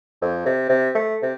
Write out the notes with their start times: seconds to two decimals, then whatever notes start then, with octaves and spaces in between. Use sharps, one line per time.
0.22 F2
0.46 C3
0.69 C3
0.95 A3
1.22 C3